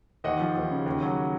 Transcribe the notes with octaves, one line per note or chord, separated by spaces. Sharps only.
D#2 D#5 F#5
F3
D#2
C#3
D#2
F#3